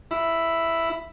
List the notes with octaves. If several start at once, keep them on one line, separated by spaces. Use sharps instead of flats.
E4